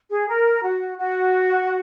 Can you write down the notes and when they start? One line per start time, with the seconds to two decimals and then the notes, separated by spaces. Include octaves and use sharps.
0.10 G#4
0.27 A#4
0.63 F#4
0.98 F#4